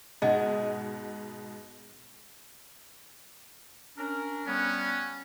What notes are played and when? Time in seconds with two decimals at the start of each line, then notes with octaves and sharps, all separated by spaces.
0.22 G#2 B2 G#3 D#5 F#5
3.97 C#4 D4 A#4
4.47 G3 B3 C#4